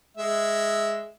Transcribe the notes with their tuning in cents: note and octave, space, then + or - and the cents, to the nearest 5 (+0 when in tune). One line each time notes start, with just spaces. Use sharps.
G#3 +0 E5 +0